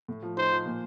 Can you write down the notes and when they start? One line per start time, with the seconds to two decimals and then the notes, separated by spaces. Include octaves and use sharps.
0.08 A2
0.22 F3
0.37 D#4 C5
0.52 F3
0.66 A#2